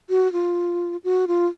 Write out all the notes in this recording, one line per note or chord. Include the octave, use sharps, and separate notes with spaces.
F#4
F4
F#4
F4